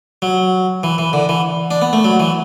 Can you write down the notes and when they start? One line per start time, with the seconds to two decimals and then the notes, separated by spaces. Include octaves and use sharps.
0.22 F#3
0.83 E3
0.98 E3
1.13 D3
1.29 E3
1.71 D4
1.82 B3
1.93 A3
2.05 F#3
2.20 E3